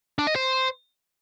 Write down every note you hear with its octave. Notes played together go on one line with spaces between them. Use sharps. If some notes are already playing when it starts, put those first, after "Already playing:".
D4
D#5
C5